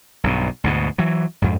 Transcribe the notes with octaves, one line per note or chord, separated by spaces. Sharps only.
B1 G2 B2
D2 G#2 B2
E3 F#3
F2 G#2